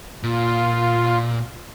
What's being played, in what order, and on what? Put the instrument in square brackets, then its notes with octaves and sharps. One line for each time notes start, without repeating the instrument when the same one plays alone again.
[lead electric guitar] A#2 [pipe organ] F4